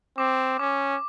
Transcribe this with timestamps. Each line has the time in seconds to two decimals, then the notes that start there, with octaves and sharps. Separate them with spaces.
0.18 C4 D6
0.59 C#4 D6